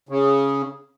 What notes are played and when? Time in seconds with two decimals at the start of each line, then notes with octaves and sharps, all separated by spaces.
0.09 C#3